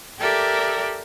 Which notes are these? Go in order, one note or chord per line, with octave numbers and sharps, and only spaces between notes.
G4 A4 A#4 D5 E5